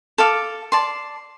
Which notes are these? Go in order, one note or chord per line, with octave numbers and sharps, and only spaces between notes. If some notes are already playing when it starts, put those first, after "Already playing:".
A4 F5 D6
D5 A5 C6